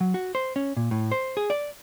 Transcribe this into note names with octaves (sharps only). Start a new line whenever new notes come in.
F#3
F#4
C5
C#4
A#2
A2
C5
G#4
D5